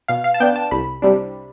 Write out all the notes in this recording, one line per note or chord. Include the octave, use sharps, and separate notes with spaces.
B2 F5
F5
A5
B3 D4 G5
A5
C2 B5
C3 G3 D4